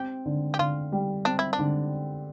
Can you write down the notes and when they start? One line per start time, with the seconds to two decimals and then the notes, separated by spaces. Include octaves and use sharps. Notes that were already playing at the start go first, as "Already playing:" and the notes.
Already playing: C4 G4
0.26 D3
0.54 G4
0.59 D3 F4
0.92 G3
1.25 C4 D4
1.39 E4
1.53 D4
1.59 D3